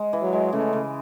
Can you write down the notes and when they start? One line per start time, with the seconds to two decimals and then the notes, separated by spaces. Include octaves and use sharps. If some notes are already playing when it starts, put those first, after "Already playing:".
Already playing: G#3
0.13 E3
0.22 F#3
0.32 G#3
0.53 C#3 A3
0.73 C#3